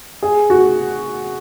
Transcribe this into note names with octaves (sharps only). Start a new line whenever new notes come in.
G#4
F#4